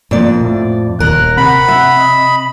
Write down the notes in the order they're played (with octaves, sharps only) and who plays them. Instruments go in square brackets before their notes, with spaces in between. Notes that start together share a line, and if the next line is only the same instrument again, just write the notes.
[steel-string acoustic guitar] F2 D5 [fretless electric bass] A2 A#3
[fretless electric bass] A2
[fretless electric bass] D#1 D#2 [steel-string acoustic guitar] A#4 [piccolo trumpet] F#6
[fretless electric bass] C3 [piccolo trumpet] F#5 [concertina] B5
[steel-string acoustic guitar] E5
[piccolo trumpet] D#5